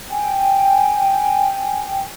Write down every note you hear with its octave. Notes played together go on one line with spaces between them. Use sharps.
G5 G#5